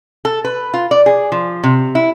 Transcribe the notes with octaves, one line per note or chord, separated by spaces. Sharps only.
A4
B4
F4
D5
G#4
F3
C3
E4